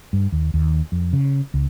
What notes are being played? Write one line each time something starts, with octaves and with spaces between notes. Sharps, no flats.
G2
D#2
D#2
F2
C#3
C#2